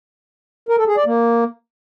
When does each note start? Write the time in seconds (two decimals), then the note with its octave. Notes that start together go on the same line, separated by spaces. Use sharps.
0.69 A#4
0.78 A4
0.87 G#4
0.97 D5
1.06 A#3